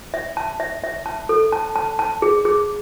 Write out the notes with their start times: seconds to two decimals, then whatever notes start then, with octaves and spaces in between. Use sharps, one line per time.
0.14 E5
0.37 A5
0.60 E5
0.84 E5
1.06 A5
1.29 A4
1.52 A5
1.76 A5
1.99 A5
2.22 G#4
2.45 G#4